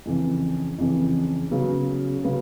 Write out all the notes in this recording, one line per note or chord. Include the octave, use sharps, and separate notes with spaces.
F2 C#3 E3
F2 C#3 E3
C#3 F#3 B3
C#3 F#3 B3